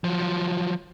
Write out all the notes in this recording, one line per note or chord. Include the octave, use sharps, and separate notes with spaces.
F3 F#3